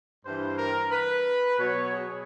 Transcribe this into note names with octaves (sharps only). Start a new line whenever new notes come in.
G2 E3 C5
A#4
B4
B2 F#3 C#5
G#4